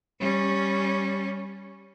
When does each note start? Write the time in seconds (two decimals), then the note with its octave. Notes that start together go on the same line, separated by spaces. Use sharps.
0.20 G3 C#4